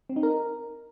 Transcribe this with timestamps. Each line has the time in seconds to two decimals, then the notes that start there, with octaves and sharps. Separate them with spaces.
0.09 C4
0.16 D#4
0.23 A#4